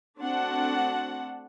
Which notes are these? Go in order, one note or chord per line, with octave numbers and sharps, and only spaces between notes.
A3 C4 D4 F#4 F#5 A5